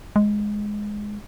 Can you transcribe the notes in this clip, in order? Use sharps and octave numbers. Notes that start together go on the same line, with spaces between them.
G#3